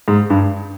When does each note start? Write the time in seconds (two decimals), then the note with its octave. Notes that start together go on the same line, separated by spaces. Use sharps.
0.08 G#2
0.30 G2